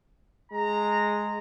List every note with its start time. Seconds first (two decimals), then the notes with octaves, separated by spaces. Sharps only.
0.52 G#3 A#5